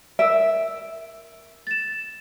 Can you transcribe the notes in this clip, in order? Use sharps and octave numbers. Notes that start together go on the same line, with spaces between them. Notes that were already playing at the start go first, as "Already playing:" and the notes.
A#4 E5 E6 D7
A6 E7